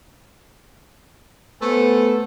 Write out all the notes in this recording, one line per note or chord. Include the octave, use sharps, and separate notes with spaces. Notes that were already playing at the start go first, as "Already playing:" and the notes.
A3 B3 A4 B4 C5 G#5